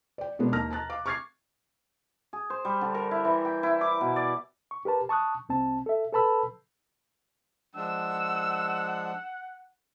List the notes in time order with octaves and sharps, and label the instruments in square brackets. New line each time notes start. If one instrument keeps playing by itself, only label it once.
[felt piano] D5 G5
B2 G#3 B3 D4 A#4
D#2 A#4 A5 A#5 F6 A#6
A5 A#5 F#6 A6
F5 D6
C#6 D6 F6 G#6 A6 C7
[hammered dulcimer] G#4
C5
G3
D3
A#4
E4
E3
G5
E4
D6
B2
D5
[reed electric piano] C#6
G4 A#4 B4 A5
A5 C#6 D#6 F#6
C2 C4 A5
A4 E5
A4 B4 A5 B5 E6
[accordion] F3 G#3 D4 [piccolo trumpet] F#5 [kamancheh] E6